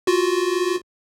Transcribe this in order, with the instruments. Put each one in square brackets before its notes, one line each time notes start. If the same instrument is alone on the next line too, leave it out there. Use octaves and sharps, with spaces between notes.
[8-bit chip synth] F4 F#4